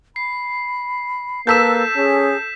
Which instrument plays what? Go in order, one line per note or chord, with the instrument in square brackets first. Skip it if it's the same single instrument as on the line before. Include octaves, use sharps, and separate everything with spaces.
[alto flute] B5 [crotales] C7
[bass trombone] A#3 [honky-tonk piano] A4 E6 [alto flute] B4 [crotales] G6 B6 E7
[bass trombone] C#4 [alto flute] G#4